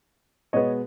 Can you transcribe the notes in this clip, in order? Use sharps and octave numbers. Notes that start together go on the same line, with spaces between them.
B2 G#3 B3 C#5 D#5